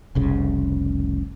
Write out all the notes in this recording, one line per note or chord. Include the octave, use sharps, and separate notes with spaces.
F1 C2 C#3